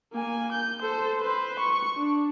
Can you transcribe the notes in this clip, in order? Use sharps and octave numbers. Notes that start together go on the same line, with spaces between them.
A#3 G#5
G6
A4 C5
B4 C5
C#6
D4